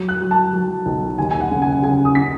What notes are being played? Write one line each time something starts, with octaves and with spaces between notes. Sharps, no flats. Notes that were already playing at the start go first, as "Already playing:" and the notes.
Already playing: F#3
F#6
F#3
A5
F#3
B1
D#2 G#5
G#5
F#5
C#3
G#5
C#3 G#5
D#6
C#3 B6